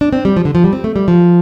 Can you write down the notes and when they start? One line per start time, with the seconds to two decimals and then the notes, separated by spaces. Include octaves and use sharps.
0.01 D4
0.13 C4
0.25 G3
0.37 F3
0.45 D3
0.55 F3
0.64 G3
0.73 C4
0.84 A3
0.96 G3
1.08 F3